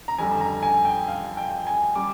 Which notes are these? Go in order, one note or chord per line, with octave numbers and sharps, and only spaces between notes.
A#5
F2 D3 G3 G#5
A#5
G#5
G5
F5
G5
G#5
G3 D6